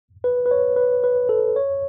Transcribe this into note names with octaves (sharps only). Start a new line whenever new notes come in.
B4
B4
C#5
B4
B4
A4
C#5